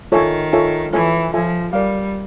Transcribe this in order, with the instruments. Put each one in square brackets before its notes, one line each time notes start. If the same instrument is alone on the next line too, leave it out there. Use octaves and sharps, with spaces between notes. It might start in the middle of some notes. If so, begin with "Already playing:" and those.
[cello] D#3 [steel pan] F4 A4 C#5 E5 G#5
[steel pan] F4 A4 C#5 E5 G#5
[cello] E3 [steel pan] F4 A4 C#5 E5 G#5
[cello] F3 [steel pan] F4 A4 C#5 E5 G#5
[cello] G3 [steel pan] A#4 D5 F5